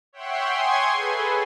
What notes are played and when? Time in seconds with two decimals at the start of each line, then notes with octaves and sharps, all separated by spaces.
0.13 C#5 E5 F#5 G5 C6
0.48 G#5 C6 C#6 D#6 G#6
0.92 G#4 A4 B4